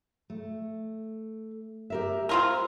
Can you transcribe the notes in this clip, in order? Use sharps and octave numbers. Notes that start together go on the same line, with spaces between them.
A3
G4 A#4 E5
C4 F4 A#4 G#5